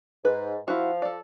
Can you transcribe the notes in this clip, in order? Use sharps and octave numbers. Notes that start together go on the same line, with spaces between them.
G#2 B4
F3 E4 F#4 F5
A4 D5